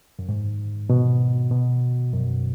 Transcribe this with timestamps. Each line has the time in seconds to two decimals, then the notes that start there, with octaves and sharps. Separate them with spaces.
0.19 F#2
0.29 G#2
0.90 B2
1.51 B2
2.13 F#2